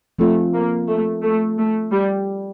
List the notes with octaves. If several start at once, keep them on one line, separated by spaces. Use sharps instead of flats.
F3 A3 C4 F4
A#3
A3
A3
A3
G3